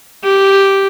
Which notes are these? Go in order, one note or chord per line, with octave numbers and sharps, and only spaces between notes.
G4